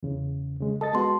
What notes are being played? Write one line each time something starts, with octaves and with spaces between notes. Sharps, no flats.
E2 C#3
C#3 G#3
A4 D#5 A5 A6
G#3 B3 F#4 A5 C6